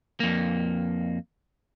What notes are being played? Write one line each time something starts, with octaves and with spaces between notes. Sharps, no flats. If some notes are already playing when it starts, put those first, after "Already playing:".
F2 A#3